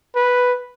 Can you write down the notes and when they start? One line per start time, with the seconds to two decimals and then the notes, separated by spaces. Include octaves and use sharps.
0.15 B4